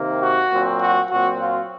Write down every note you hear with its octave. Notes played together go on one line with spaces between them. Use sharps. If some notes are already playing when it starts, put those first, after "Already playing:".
Already playing: C3 D#3 A#3
F#4
A#2 F#3 C4
F#4
A#2 F#3 C4 F#4
F4